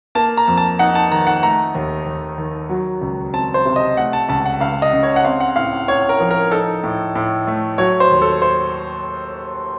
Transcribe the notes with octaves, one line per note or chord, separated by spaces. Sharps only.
A#3 A5
A#5
F2
A5
D#4 F#5
A5
D#3 A#5
F#5
A3 A#5
D#2
D#2
D#3
F#3
C#2
C4 A5
C5
C3
D#5
A3 F#5
A5
C#2 A5
F#5
C#2 F5
D#5
C#3
C#5
F#5
C4 F5
F#5
A2 F5
A2 C#5
A#4
F3
A#4
D#4 A4
A2
A2
A3
F#3 C#5
C5
D#2
A4
C5